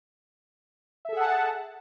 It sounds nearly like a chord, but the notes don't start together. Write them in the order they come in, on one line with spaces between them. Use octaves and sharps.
E5 A4 G#4 F#5 A5